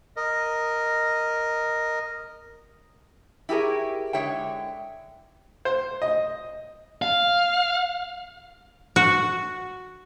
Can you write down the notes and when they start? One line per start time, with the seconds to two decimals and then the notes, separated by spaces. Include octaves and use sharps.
0.16 A#4 D#5
3.49 E4 G4 G#4 A#4 C#5
4.13 D3 G#3 A4 C#5 E5 G5
5.65 C5
6.02 D#5
7.02 F5
8.96 F#4